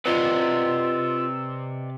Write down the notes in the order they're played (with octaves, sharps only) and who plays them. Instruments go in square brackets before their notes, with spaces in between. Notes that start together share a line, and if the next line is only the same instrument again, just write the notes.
[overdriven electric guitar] C3 [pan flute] F4 [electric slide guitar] B4 D5 D#5 [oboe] E6